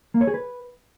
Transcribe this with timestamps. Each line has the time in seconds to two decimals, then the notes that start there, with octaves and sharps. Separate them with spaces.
0.14 A#3
0.21 C#5
0.27 G#4
0.34 B4